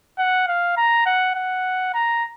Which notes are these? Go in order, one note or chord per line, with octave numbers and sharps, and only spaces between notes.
F#5
F5
A#5
F#5
F#5
A#5